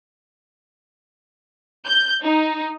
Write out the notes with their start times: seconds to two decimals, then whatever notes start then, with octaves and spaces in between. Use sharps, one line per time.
1.86 G6
2.23 D#4